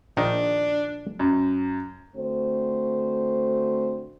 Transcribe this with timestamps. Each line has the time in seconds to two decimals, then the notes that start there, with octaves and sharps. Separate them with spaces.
0.17 A#1 D#3 D4 D#4
1.19 F#2
2.15 D3 A3 C4 F#4 C5